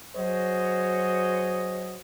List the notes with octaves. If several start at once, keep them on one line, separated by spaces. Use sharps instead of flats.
F#3 F#4 G#4 C5 C#5 D#5